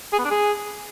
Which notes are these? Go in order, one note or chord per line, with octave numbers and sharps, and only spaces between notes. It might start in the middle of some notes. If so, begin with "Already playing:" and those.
G#4
B3
D4
G#4